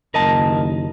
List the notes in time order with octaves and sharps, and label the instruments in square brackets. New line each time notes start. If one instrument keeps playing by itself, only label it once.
[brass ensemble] F#1 D#2 [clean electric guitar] A#4 D#5 A5